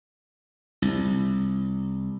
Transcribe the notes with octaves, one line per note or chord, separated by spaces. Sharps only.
C2